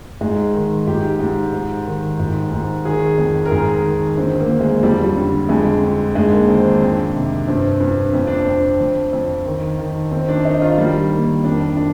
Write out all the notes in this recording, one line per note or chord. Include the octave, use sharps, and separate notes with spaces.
G#2 G#3
D#3
G#2 G4
G#2
G#2
D#3
G#2
G#2
D#3 G#4
F2
A#4
G#2 G#4
D#3
D3 C4
A#3
D3
G#3
F2 G3
G3
D3
F2 G#3
D3
G#2 G#3
A#3
D#3 C4
D4
F2
C3
G2 C4
G2
F2 C4
D4
C4
F2
F2
F2
D#3
D#3
D#3 C4
D4
D#3 D#4
F4
D#3 G3
D#3 A#3
F2 D4
D4